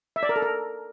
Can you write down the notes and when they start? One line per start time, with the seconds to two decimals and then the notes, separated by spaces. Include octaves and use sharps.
0.16 E5
0.23 D5
0.29 A#4
0.36 A4
0.42 A#4